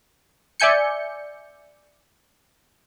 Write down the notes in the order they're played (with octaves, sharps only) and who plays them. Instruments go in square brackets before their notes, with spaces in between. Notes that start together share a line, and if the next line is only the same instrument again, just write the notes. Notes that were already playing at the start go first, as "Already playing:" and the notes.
[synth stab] D5 E5 G#5 G6 C#7